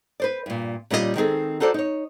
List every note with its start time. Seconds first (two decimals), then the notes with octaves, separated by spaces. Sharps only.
0.20 B4 C5 D5
0.46 G2 A#2
0.91 A#2 G3 C#4 F4 G4 D#5
1.16 D#3 G#3 B3 C4 G#4 A4
1.60 D#4 F#4 A4 C5 D5
1.74 D#4 C#5